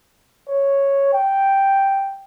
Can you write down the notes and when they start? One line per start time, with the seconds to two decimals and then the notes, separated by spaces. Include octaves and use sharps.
0.48 C#5
1.13 G5